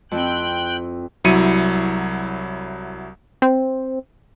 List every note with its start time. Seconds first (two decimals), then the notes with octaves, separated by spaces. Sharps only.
0.12 F2 C4 E4 G5 F#6
1.24 C2 F#3 E4 C#7 D#7
3.42 C4